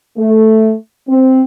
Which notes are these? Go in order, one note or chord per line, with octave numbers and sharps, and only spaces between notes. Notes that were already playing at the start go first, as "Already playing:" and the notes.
A3
C4